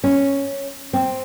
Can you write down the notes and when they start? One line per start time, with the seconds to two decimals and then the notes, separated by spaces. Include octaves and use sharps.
0.04 C#4
0.93 C4